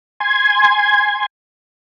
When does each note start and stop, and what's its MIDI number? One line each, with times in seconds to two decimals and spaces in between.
0.20 1.26 80
0.20 1.26 84
0.20 1.26 92